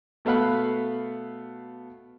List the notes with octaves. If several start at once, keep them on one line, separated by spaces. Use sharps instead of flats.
B2 A3 B3 F5 B5 F#6